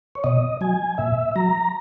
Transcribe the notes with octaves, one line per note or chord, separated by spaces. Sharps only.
C#5
B2 D#5
F#3 G#5
A#2 E5
F#3 A#5